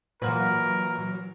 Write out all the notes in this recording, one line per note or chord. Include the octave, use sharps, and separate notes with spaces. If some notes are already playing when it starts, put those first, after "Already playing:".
A#2 E3 F#3 F#4 A#4 B4